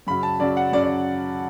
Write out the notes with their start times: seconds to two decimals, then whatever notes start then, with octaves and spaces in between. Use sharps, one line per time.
0.07 F#2 C#3 F#3 B5
0.23 A5
0.40 F#2 C#3 F#3 D5
0.57 F#5
0.72 F#2 C#3 F#3 D5
0.84 D5